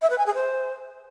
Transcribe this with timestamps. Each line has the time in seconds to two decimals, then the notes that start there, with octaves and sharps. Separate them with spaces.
0.02 E5
0.10 B4
0.18 G#5
0.26 G#4
0.34 C5